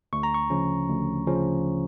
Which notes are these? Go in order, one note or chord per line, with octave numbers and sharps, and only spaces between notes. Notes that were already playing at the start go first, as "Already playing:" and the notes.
D2 C#6
A#5
C#6
C#3 F3 C#4
D2
C#3 F3 C#4